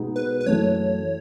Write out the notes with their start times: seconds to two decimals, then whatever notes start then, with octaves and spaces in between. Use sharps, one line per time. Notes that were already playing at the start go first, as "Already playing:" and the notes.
Already playing: B2 G#3 B3 D#4 G#4
0.16 B4
0.41 B4
0.46 F#2 E3 A3 C#5